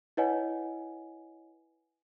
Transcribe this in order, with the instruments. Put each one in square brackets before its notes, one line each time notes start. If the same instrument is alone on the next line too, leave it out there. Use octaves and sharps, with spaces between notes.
[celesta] E4 B4 C#5 D#5 F#5 G#5